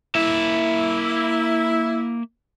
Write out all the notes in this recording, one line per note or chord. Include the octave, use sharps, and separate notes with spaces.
A#3 E4 E5